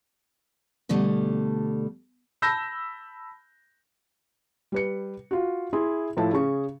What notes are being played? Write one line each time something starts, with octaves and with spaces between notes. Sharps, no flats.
B2 D3 G3 A3
A5 B5 E6 G6 A#6
G3 B4 C#7
F4 F#4
E4 G#4 C6
A2 F3 A3 E4 A5
C#3 G#4 C#6